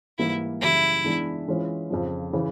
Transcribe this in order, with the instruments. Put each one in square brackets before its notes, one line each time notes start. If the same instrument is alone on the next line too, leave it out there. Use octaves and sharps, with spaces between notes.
[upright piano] G#2 E3 G3 A#3 [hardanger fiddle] E4
[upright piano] F#2 C#3 E3 G3 [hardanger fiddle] E4
[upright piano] E3 G#3 B3 D4
E3 G#3 C#4 F4
F2 C#3 F3
C#3 E3